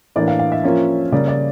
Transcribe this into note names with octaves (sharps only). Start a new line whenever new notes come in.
A2 E3 A#3 D4 D5
F5
F5
E5
F3 A#3 C#4 F4
C#3 G3 A#3 D5
D5